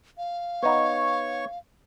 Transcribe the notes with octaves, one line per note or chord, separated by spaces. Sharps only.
F5
B3 D#4 C#5 C#6